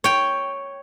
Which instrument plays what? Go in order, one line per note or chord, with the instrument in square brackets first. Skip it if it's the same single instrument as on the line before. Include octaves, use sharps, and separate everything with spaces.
[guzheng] C#5 G5